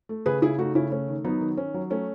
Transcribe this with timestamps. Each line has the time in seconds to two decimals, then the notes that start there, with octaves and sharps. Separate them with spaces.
0.09 A3
0.26 C#3 G#4 B4
0.42 C#3 E4 G#4
0.58 A3 D#4 F#4
0.75 C#3 C#4 E4
0.92 A3 C#4
1.08 D#3
1.24 F#3 B3 D#4
1.41 D#3
1.57 D#3 C#4
1.74 F#3
1.90 A3 C#4